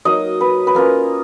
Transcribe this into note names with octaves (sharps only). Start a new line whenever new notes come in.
F#3 A#3 D#4 D#5
B4
B4
A#3 C#4 F4 A#4